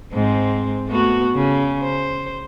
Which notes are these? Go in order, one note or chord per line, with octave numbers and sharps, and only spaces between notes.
G#2 C4
A3 B3 F#4
C#3
C5